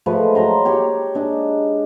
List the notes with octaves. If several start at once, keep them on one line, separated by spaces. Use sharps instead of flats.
F3 G#3 A3 B4
F#3 C5 A#5 C6
G4 C#5 G5
G#3 D4 D5 D#5